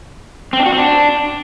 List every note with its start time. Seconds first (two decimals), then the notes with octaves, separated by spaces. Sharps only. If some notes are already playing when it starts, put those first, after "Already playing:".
0.53 C4
0.59 D4
0.66 F#4
0.72 C4
0.79 D4